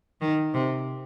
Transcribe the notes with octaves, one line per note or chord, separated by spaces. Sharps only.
D#3
C3